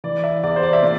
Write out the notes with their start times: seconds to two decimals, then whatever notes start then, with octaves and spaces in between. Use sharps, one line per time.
0.04 E3 D5
0.24 E5
0.43 E2 D5
0.56 C5
0.63 D5
0.73 E5
0.82 A#2 D5